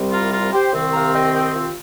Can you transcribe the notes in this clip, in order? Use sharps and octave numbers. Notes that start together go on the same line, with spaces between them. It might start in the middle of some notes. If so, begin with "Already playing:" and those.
Already playing: C2 C3 G3 C4
F4 A#4
F4 A#4
G4 C5
C2 C3 D#3 C4
F5 A#5
D#5 G5
D#5 G5
F4